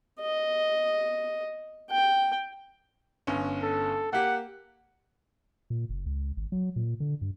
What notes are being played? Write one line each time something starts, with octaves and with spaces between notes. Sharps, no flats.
D#5
G5
G1 C#4
A4
A#3 G4 F#5
A#2
F#1
C#2
G#1
F#3
A#2
D3
G2